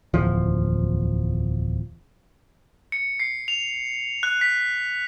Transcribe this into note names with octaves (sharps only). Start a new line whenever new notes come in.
D1 E2 F3
C#7
C7
F7
F#6
B6